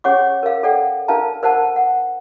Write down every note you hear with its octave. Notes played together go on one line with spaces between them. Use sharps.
C#4 G#4 C#5 F#5 C#6 D6
A#4 F5
A4 D5 F#5 G5
D4 A#4 B4 F5 A5 A#5
A#4 C5 F#5 A5
F#5